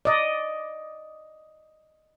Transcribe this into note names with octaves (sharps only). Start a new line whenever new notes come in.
D5 D#5